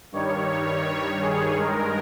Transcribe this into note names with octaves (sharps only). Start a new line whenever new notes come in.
G2 D#3 G3 C#5
G#4
G2 D#3 G#3 A#4